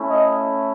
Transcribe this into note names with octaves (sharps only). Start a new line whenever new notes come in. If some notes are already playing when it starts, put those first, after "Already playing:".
Already playing: A3 C#4 E4
D#5